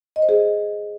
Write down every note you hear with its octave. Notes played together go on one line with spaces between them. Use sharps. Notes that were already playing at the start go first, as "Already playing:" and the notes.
D#5
C5
G#4